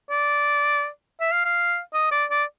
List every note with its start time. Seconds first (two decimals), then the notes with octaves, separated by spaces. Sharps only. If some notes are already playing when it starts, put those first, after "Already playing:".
0.10 D5
1.21 E5
1.32 F5
1.45 F5
1.94 D#5
2.11 D5
2.31 D5